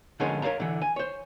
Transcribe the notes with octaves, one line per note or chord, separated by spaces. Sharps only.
D3 F3 G#3 C#4 G#4 A#4
A#4 C#5 D5 F5 A#5
D3 E3
G#5
C5 C#5